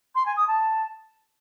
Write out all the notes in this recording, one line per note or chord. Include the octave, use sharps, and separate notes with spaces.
C6
G#5
D#6
A5